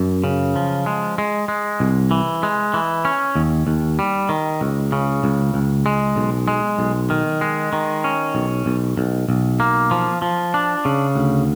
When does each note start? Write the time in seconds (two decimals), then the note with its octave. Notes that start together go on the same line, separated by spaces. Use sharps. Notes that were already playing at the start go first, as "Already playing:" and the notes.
Already playing: F#2
0.24 C#3
0.56 F3
0.86 G#3
1.18 G#3
1.48 G#3
1.80 C2
2.11 E3
2.43 G#3
2.74 E3
3.05 C#4
3.35 D#2
3.67 D#2
3.99 G3
4.29 D#3
4.61 C#2
4.92 C#3
5.24 C#2
5.54 C#2
5.86 G#3
6.16 B1
6.48 G#3
6.79 B1
7.10 D#3
7.41 G#3
7.73 D#3
8.04 C#4
8.35 B1
8.66 B1
8.98 B1
9.29 B1
9.60 A#3
9.91 F3
10.22 F3
10.54 D4
10.85 C#3
11.16 D2